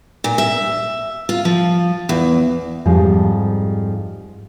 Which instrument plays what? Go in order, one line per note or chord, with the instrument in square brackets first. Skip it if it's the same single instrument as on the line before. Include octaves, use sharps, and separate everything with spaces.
[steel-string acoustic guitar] A#2
E5
F4
F3
E2
[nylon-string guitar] F2 G#2 F3 G3